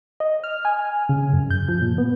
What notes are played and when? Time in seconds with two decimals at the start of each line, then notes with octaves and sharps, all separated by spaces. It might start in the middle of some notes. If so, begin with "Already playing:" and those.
0.20 D#5
0.44 F6
0.65 G#5
1.09 C#3
1.33 F#2
1.51 G6
1.69 F3
1.82 A#2
1.98 B3